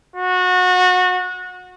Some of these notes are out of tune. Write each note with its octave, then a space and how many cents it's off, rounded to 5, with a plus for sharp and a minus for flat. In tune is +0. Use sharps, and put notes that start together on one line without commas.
F#4 -25